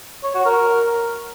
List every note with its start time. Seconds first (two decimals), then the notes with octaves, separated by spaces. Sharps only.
0.23 C#5
0.34 F#4
0.46 A#4